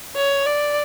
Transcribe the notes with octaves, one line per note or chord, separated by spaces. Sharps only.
C#5
D5